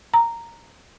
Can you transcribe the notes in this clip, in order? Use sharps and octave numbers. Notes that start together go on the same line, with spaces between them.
A#5